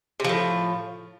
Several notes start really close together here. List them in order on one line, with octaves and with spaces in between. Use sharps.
C3 F3 A2